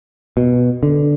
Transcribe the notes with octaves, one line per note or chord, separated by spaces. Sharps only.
B2
D3